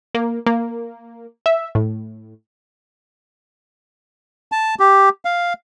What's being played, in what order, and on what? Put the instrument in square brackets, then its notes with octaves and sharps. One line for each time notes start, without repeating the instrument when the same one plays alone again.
[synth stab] A#3
A#3
E5
A2
[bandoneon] A5
G4
F5